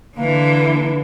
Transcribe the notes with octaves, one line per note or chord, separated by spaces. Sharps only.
D3 E3 A#3